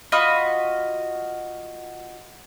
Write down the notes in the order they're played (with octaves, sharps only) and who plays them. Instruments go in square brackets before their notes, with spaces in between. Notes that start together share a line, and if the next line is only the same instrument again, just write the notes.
[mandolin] F4 F#4 D#5 B5